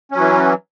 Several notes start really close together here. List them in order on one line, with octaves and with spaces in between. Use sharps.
C#4 F#3 E3